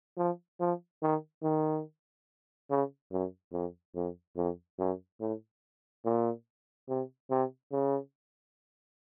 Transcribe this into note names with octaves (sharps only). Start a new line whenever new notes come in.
F3
F3
D#3
D#3
C#3
F#2
F2
F2
F2
F#2
A2
A#2
C3
C3
C#3